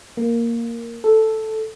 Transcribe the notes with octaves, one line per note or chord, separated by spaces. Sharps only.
A#3
A4